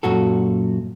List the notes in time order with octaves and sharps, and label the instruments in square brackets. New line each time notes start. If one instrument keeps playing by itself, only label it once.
[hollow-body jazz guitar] F#2 A#2 F#4 A4